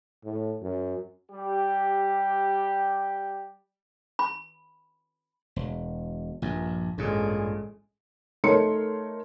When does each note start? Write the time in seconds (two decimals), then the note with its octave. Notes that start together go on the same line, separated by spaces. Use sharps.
0.24 A2
0.62 F#2
1.32 G3 G4
4.19 B5
5.56 E1
6.42 A#1 G2
6.98 A1 G2 A#2 G#3
8.44 A3 D#4 A#4 C#5 C6 C#7